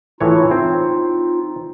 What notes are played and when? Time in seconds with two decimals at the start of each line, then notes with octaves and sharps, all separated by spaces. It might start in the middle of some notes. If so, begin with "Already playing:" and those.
0.21 A2 E3 D#4 F4 C#5
0.51 C4